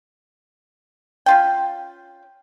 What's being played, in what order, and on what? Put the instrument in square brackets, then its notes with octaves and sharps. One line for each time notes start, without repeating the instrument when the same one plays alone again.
[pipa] C#4 F4 G5